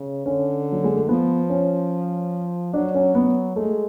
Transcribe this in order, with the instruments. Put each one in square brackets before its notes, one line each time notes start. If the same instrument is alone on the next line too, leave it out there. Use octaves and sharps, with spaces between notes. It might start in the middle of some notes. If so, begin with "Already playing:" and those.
Already playing: [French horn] C#3
[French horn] D3 [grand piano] C#4
[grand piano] F#3
G#3
A3
[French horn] F3 [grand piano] B3
[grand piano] C#4
[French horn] F#3 [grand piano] D4
[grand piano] C#4
B3
[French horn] G#3 [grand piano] A3